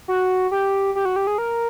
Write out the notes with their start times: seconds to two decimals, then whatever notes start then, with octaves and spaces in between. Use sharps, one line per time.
0.08 F#4
0.51 G4
0.95 G4
1.05 F#4
1.16 G4
1.27 G#4
1.38 A#4